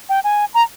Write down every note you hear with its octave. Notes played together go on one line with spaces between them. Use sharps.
G5
G#5
A#5